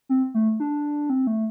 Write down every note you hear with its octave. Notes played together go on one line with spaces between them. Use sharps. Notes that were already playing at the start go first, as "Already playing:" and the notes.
C4
A3
D4
C4
A3